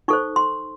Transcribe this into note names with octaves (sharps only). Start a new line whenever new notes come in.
D#4 A4 C5 C#6
C6